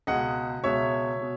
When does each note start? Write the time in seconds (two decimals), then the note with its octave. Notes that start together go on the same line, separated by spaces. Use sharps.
0.07 C#2 B2 G#3 D#5 F#5
0.64 C#2 B2 G#3 C#5 E5
1.22 B2